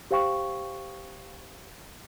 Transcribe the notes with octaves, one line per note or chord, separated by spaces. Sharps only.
G4 C5 F5 G5 C#6